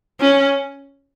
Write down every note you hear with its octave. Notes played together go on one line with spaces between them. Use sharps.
C#4